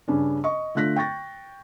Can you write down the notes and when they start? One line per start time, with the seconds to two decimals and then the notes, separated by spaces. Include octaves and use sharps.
0.08 G2 C#3 C#4 D4
0.44 D#5 C#6
0.75 D3 A3 F4 F#6 A#6 B6
0.96 G5 C#6 A6 A#6